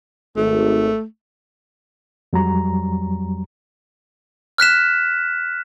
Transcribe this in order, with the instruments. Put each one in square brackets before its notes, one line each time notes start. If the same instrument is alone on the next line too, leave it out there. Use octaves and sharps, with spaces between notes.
[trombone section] G#1 [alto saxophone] A3
[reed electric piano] F2 F#3 G3 A#5
[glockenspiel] F6 F#6 B6 E7